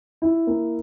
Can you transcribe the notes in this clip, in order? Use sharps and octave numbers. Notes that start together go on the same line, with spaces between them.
E4
A#3